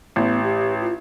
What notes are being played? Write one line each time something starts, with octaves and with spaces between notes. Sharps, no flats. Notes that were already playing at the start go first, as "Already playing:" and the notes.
A1 B3
G4
F4